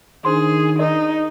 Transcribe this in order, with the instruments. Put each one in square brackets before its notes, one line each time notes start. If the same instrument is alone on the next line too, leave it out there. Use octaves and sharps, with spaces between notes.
[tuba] D#3 [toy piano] D4 C5 C6 [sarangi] G#4
[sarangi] D#4 [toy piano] A#4 D5 D#5